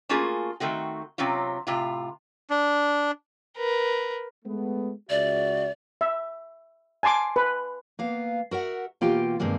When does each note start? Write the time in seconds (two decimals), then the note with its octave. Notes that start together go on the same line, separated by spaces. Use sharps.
0.09 A3 A#3 C#4 F4 F#4 G#4
0.60 D#3 A3 C4 F#4
1.18 C3 F#3 C4 C#4 F4
1.67 A2 C3 F4
2.50 D4
3.57 A#4 B4
4.45 G#3 A3 B3
5.10 C#2 F#4 D5 E5
6.01 E5
7.03 G#5 A5 C6 D6
7.36 B4
7.99 A#3 B3 F5
8.51 F#4 A#4 E5 F#5
9.01 B2 E3 A#3 F4 G4 G5
9.40 G2 C3 D#3 G#3 A#3